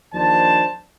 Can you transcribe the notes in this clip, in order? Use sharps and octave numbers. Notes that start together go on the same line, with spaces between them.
D#2 F3 D4 C5 A5